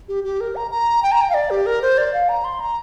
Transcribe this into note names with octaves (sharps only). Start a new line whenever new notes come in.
G4
G4
A#4
A#5
A#5
G5
A#5
G5
F5
D5
G4
A#4
C5
D5
F5
A#5
C6
A#5